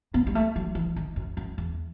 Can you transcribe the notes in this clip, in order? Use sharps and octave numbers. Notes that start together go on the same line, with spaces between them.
B3
G3
A3
F#3
E3
D#3
F#2
F#2
E2